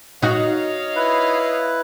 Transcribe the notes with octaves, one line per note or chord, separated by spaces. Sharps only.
D#4 F#4 C#5 D#5 F5
E4 B4